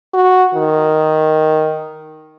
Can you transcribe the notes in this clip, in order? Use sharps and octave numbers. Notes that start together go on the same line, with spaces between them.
F#4
D#3